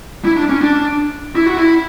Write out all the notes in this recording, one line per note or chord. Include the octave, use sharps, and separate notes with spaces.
E4
D4
C#4
D4
E4
F#4
E4